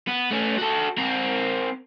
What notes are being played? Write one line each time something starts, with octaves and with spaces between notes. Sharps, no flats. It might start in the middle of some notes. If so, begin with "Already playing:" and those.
B3
A3 C#4
F#4 A4
C4 A#4